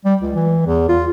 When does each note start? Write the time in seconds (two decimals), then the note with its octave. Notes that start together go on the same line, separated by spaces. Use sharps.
0.05 G3
0.21 C#2
0.35 E3
0.66 E2
0.89 F4